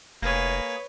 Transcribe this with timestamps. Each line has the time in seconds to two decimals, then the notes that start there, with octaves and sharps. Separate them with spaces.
0.22 F1 A#3 G#4 B4 C#5